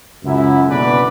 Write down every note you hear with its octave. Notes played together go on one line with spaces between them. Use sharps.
C#2 F#2 E4
F#1 B2 D3 E3 B4 D5